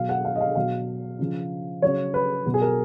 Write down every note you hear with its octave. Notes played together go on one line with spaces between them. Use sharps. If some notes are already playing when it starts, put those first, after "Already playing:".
Already playing: B2 F#3 F5
F#5
F5
D#5
F5
B2 F#3 F5
C#3 F3
C#3 F#3 C#5
B4
B2 F#3
G#4
A#4